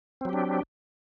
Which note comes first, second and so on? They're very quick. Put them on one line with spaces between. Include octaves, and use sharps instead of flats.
C4 F#3 G4 D4